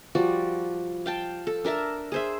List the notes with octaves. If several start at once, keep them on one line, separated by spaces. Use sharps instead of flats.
F3 G3 F#4 D5
F5 G5 A5
A4
D4 A#4 E5 A5
G#4 C5 E5